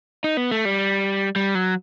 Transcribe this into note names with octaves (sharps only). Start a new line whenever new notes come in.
D#4
B3
A3
G3
G3
F#3